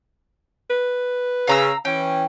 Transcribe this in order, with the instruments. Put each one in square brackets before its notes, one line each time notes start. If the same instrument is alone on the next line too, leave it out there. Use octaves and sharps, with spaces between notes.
[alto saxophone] B4
[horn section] C#3 [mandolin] F5 A#5 E6
[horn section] E3 C#4 [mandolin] G5